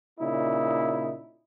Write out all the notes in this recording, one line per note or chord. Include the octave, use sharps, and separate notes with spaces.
A#2 C#3 D#4 E4